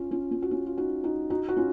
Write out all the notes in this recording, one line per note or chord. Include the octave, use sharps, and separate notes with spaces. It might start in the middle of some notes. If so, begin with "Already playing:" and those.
Already playing: C#4 F4
C#4 F4
C#4 F4
F#4
C#4 F4
F4
D#4 F#4
D#4 F#4
D#4 F#4
F#4
C#4 F4